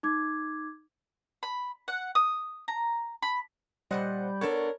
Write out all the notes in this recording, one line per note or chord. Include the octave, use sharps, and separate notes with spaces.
D#4 D6 G#6
B5
F#5
D#6
A#5
B5
A#2 G3 G#3 C5 D#5 F#5
B3 D4 A4 A#4 C#5